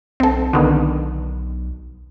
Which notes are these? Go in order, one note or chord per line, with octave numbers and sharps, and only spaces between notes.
B1 C4 A4
B1 D3 D#3 B3